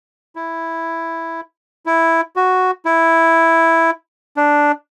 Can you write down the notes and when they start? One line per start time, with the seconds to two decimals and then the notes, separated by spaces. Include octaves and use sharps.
0.36 E4
1.86 E4
2.36 F#4
2.85 E4
4.37 D4